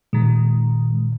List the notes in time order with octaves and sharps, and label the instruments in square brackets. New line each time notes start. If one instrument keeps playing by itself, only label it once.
[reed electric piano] A#2 [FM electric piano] D#3 G#3